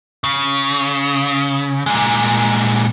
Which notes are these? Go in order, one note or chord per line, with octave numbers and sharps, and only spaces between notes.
C#3
A#2 G#3